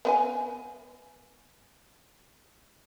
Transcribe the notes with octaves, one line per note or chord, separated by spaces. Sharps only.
B3 B4 G#5